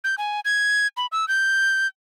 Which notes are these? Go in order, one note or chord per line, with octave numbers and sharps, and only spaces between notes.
G6
G#5
G#6
B5
E6
G6